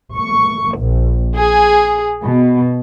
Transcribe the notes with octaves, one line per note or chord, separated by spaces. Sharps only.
C#6
A#1
G#4
B2